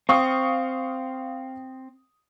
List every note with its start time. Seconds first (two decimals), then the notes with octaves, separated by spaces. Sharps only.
0.09 C4 F5 C#6 D#6